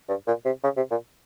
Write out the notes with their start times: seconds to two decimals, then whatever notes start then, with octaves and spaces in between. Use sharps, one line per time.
0.09 G2
0.27 A#2
0.45 C3
0.63 C#3
0.77 C3
0.91 A#2